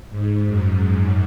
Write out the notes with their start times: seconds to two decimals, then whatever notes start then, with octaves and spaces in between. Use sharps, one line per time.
0.11 G#2
0.46 F#2
0.81 G#2